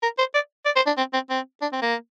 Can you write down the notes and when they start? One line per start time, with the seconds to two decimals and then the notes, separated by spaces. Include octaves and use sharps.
0.03 A#4
0.19 C5
0.35 D5
0.66 D5
0.76 C5
0.87 D4
0.98 C4
1.14 C4
1.30 C4
1.62 D4
1.73 C4
1.82 A#3